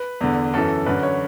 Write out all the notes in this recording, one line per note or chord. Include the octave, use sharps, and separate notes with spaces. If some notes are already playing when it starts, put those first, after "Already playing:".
Already playing: B4
E2 D3
F#2 E3 A4
F#2 D3 B4
C#5